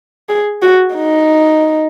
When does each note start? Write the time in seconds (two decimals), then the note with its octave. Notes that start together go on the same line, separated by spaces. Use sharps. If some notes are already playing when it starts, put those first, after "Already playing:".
0.29 G#4
0.62 F#4
0.95 D#4